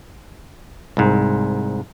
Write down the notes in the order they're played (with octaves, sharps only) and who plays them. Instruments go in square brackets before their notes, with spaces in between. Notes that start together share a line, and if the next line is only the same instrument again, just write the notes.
[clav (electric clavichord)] C2 G#2